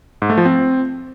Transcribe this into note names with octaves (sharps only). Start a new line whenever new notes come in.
G#2
A3
F3
C4